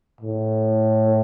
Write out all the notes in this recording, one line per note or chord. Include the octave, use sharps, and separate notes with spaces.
A2